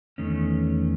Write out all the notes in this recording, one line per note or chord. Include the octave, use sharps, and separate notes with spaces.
E2 D#3 A3 C#4